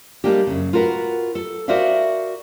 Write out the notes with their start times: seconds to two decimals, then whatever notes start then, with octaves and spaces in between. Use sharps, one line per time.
0.24 G3 G#3 A#3 D4 G4
0.47 F#2 C#3
0.73 F4 F#4 A#4 B4 F#5
1.35 A4
1.68 F#4 A#4 C5 D5 E5 F5